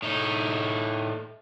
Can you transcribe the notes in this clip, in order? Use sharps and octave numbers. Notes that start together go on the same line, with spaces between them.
A2 D#4